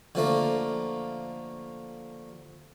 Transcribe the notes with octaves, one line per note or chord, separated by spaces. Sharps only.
D3 F3 A3 A#3